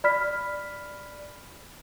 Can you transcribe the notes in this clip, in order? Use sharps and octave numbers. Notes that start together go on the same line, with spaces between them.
D5 B5 F6 B6